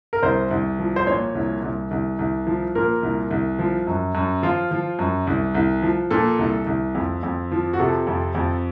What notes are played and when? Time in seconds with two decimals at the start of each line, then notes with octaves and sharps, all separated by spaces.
0.13 A#4
0.23 C2 C5
0.51 C2
0.79 F3
0.96 C5
1.07 A#2 C#5
1.35 C2
1.63 C2
1.91 C2
2.19 C2
2.47 F3
2.75 A#2 A#4
3.03 C2
3.31 C2
3.59 F3
3.87 F#2
4.15 F#2
4.43 F3 F4
4.71 F3
4.99 F#2
5.27 C2
5.55 C2
5.82 F3
6.11 A#2 A4
6.39 C2
6.67 C2
6.95 F2
7.23 F2
7.51 F3
7.73 F#4
7.79 C3 A4
8.07 F2
8.35 F2